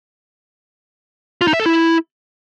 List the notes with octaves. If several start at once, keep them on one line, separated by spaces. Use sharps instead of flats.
F4
D#4
E5
A4
E4